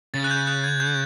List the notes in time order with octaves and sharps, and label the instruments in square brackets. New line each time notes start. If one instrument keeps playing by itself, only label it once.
[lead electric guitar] C#3 [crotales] A6
[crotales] F#6
G6
F#6
G#6
G6